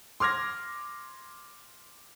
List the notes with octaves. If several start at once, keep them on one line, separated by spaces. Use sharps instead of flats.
C6 D6 F6 G#6 A#6